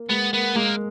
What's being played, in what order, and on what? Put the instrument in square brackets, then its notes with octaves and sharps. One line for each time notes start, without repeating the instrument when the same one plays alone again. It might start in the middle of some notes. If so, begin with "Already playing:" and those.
Already playing: [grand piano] A#3
[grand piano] G#3 [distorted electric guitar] B3
[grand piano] A#3 [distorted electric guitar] B3
[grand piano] G#3 [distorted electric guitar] A#3